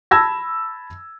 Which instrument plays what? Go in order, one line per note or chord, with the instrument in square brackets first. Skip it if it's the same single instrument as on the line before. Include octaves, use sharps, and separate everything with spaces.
[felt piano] A5 B5 E6 G#6 A#6